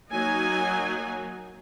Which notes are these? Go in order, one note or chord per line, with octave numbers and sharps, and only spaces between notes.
F#3 A#3 D#4 G#5